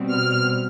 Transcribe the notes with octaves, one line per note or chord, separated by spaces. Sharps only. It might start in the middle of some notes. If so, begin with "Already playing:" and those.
Already playing: B2 G3 C4
F6